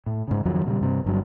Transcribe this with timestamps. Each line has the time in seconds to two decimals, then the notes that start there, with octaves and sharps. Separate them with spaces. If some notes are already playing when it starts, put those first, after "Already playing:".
0.06 A2
0.28 G#2 C#3
0.45 F2 D#3 F3 F#3
0.65 A#2 C#3 E3 G3
0.81 G2 C3
1.04 G1 G2 F#3